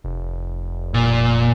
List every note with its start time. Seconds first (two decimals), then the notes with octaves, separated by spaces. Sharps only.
0.04 F1
0.94 A#2